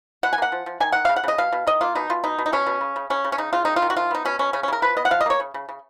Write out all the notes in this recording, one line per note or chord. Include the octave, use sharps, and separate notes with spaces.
B2 F#5
G#5
A#3 F#5
F3
F3
D#3 G#5
D#3 F#5
C#3 F5
F#5
C#3 D#5
B2 F5
B2
D#3 D#5
A#3 F4
B2 D#4
B2 F4
B2 D#4
B2
D#4
B2 C#4
B2
C#3
C#3
C#3 C#4
C#3
C#4
C#3 D#4
C#3 F4
D#3 D#4
F4
D#3
F#4
F3 F4
B3 D#4
B2 C#4
B2 C#4
C#3 C#4
C#4
C#3 A#4
F3 B4
B3 D#5
F#5
F3 F5
D#5
A#3 C#5
C#3
C#3
C#3